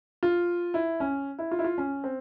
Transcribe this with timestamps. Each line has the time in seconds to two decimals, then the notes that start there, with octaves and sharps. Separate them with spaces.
0.23 F4
0.74 E4
1.00 C#4
1.39 E4
1.51 F4
1.59 E4
1.64 F4
1.78 C#4
2.04 C4